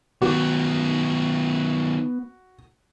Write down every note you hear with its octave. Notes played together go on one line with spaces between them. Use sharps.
D#3 F#3 B3 F#4